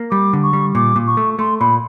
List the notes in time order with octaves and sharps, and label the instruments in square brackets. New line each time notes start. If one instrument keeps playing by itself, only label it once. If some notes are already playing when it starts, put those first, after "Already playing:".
Already playing: [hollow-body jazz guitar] A#3
[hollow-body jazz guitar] G3 [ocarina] D6
[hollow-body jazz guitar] D3
[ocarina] C#6
[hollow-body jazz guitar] G3
[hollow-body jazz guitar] A#2 [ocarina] D6
[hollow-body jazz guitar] A#2
[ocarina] C#6
[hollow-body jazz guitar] A3
[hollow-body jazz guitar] A3 [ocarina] C6
[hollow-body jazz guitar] A#2 [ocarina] B5